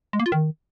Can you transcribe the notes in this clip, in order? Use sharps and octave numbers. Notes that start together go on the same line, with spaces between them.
G#3
A#3
F4
D#3